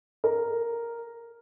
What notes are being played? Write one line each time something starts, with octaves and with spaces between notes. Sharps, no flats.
A#4